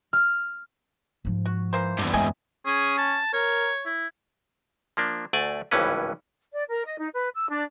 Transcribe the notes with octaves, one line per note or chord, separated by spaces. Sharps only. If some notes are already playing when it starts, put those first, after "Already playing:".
F6
G#2 F3
F#4
E3 A#3 C5
E2 G2
C3 G#3 D#5 G#5
C#4 G#4
A5
A#4 C#5
E4
F3 A#3 D4
D2 A3 D5 G#5
G#1 C#2 G2 E3 C#4 B4
D5
A#4
D#5
D#4
B4
E6
D4